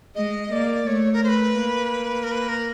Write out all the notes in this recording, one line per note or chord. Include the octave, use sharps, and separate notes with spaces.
G#3 D#5
A#3 D5
A3 C#5
A#4
A3 C5
B4
A#3
A#4
B4
A#4